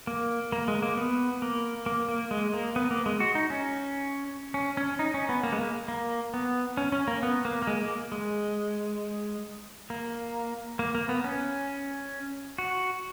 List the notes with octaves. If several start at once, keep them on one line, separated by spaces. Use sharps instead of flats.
A#3
A#3
G#3
A#3
B3
A#3
A#3
A#3
G#3
A#3
B3
A#3
G#3
F#4
D#4
C#4
C#4
C#4
D#4
C#4
B3
A#3
G#3
A#3
A#3
B3
C#4
C#4
A#3
B3
A#3
A#3
G#3
A#3
G#3
A#3
A#3
A#3
B3
C#4
F#4